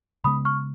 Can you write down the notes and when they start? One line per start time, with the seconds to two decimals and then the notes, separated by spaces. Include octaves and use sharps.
0.24 C#3 G#3 B3 B5 D#6
0.45 C#6 F6